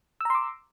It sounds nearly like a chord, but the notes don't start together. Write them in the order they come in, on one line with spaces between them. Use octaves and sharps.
E6 A#5 C6 D6